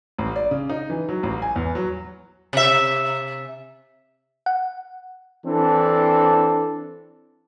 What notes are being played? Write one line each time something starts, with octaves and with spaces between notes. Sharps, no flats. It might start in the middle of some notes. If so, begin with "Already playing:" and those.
A1
D5
C#3
D#4
E3
F#3
A1
G#5
E2
F#3
C3 E5
F#5
E3 C4 D4 A4